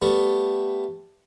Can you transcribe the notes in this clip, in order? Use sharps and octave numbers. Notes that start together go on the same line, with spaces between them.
G3 A3 B3